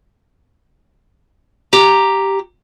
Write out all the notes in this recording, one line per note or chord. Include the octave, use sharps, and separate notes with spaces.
G4 A#5